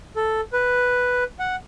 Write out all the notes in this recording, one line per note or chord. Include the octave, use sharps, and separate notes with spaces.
A4
B4
F#5